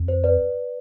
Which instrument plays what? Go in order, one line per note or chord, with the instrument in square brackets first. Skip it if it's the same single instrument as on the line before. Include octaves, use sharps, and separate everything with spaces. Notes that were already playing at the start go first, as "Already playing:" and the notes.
Already playing: [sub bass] F2
[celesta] C5
B4 D5